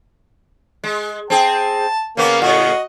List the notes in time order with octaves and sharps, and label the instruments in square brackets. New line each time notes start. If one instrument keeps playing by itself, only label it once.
[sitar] G#3
[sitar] C4 G#4 [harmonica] A5
[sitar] C#3 B3 C#4 [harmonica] A#3
[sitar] A2 C#3 [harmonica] F#4 D#5